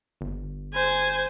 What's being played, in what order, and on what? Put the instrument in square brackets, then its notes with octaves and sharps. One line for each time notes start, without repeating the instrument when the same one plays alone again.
[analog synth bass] G1
[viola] C5 G#5